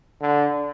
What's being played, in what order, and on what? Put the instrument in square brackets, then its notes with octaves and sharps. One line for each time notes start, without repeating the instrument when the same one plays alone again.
[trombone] D3